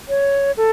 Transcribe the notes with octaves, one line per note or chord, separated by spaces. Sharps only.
C#5
A4